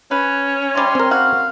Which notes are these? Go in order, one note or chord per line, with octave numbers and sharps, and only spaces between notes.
C#4 B4
C3 G3 C6
C4 A#4
F#4 F5